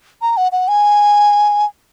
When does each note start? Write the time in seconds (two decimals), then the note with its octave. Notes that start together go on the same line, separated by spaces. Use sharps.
0.22 A#5
0.37 F#5
0.52 F#5
0.68 G#5